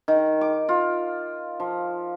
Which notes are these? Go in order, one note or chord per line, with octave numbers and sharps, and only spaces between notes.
D#3
D6
F4
F3